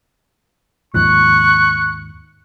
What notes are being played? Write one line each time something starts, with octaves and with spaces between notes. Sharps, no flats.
D#2 G#2 F3 C#6 F#6